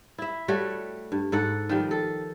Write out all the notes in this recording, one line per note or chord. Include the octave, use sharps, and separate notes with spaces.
E4 E5
G3 A3 F#4 C#5
G2
G#2 A4 F#5
D#3 F3 G3
A4